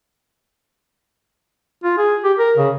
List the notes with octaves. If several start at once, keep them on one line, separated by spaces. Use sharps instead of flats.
F4
G#4
G4
A#4
C#3